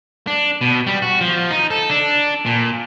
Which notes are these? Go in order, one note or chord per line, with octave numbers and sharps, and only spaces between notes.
D4
B2
G3
F#4
F3
D#4
A4
D4
A#2